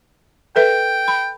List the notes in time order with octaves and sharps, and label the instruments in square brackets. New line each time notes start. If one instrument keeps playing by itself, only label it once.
[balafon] A4 B4 E5 [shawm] G5
[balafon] B5